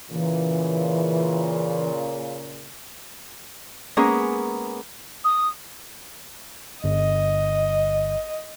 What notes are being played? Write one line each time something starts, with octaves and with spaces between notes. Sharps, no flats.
A#2 C#3 E3
G#3 A#3 B3 C#4 G#4
D#6
G1 D#5